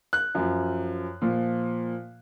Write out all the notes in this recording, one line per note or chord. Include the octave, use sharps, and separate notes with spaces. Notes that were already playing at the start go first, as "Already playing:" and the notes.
F#6
F#2 F3
A#2 F3